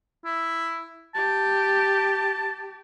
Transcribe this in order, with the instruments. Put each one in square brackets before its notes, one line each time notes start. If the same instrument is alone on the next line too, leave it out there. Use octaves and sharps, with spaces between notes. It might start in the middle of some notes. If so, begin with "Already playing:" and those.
[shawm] E4
[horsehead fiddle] G4 [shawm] A5